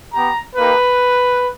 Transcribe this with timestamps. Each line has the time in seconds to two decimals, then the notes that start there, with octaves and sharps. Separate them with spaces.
0.13 B3 G4 A#5
0.56 A#3 D#4 G4 B4